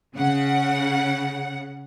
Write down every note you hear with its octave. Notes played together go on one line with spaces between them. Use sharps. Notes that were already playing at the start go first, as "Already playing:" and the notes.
C#3 F#5